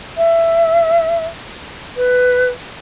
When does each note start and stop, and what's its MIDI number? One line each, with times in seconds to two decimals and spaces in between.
0.17 1.25 76
1.96 2.49 71